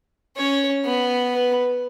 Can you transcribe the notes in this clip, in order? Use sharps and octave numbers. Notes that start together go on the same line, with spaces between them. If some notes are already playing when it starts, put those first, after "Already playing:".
C#4 C#5
B3
B4